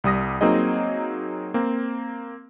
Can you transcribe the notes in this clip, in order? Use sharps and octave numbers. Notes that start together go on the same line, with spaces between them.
C2 G3 D#6 A#6
F#3 A#3 C4 D#4 G#4 D#5
A#3 C4